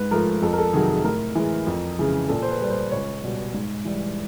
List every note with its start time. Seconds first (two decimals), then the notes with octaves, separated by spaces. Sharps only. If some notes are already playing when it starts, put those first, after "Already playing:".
Already playing: G#2 B4
0.11 F3 A3 A#4
0.42 F2 A4
0.53 A#4
0.58 A4
0.73 C3 D#3 F#3 G#4
0.90 G#4
1.04 A2 A#4
1.35 E3 G#3
1.67 F2
1.99 C#3 E3 G#3
2.29 A#2 A4
2.43 C5
2.50 B4
2.61 G3 B4
2.70 C5
2.92 C#2 C#5
3.24 B2 G3
3.54 G#2
3.85 E3 G3